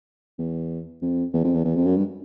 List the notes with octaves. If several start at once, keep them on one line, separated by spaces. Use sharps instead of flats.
E2
F2
E2
F2
E2
E2
F2
F#2
G2